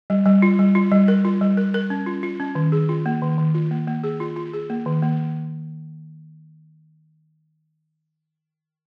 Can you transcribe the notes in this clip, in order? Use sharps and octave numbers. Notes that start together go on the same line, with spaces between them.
G3
G3
F4
G3
F4
G3
A#4
F4
G3
A#4
A#4
C#4
F4
F4
C#4
D#3
G#4
F4
A#3
D#3
D#3
F4
A#3
A#3
G#4
F4
F4
G#4
A#3
D#3
A#3